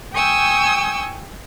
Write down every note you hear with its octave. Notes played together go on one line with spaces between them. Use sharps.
G5 G#5 C#6 D#6 E6 G6